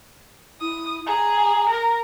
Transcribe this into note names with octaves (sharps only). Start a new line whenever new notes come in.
E4 D#6
G#4 A#5
A#4